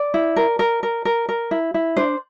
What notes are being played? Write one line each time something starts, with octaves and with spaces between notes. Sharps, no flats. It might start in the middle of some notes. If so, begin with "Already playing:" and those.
Already playing: D5
E4
A#4
A#4
A#4
A#4
A#4
E4
E4
D4 C5